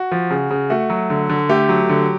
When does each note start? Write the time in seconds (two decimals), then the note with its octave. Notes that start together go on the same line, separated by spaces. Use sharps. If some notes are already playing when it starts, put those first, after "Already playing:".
Already playing: F#4
0.11 F3
0.31 C#3
0.50 C#3
0.70 A3 F#4
0.90 F#3
1.10 D3
1.29 D3
1.49 A3 G4
1.69 F#3
1.89 D3